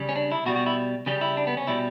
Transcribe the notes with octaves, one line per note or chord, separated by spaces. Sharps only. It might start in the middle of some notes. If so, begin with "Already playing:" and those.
Already playing: C#3 G3
C#4
D4
E4
B2 G3 F#4
F#4
E4
C#3 G3 G4
E4
D4
B3
C#4
B2 G3 E4